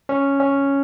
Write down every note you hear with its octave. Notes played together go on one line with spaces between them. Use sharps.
C#4
C#4